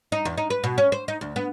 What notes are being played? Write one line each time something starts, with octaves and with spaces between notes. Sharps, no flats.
D#4
E2
D#4
B4
B2
C#4
C5
D#4
D2
B3